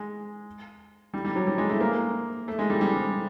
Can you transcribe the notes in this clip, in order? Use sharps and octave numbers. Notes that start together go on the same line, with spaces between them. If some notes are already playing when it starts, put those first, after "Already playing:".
Already playing: G#3
G3
G3
F#3
G3
G#3
A3
A#3
A3
G#3
G3
G3